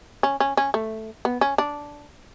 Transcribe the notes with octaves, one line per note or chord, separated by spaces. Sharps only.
C#4
C#4
C#4
A3
B3
C#4
D4